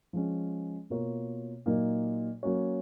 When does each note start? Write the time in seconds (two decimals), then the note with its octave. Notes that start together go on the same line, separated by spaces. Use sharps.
0.13 F3 G#3 C#4
0.90 B2 A#3 F4 A#4 C#5
1.66 A#2 F#3 A#3 D#4
2.43 F#3 A#3 C#4 F#4 C#5